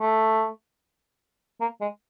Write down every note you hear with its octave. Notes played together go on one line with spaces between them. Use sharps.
A3
A#3
G#3